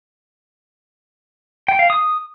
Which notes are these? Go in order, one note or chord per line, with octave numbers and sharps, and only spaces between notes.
G5
F5
D#6